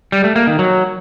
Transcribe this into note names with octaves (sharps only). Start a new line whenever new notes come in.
G3
A3
A#3
D#3
F#3